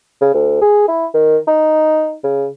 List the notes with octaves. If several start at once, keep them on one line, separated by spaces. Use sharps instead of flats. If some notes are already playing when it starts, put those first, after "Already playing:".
C#3
D2
G#4
E4
D#3
D#4
C#3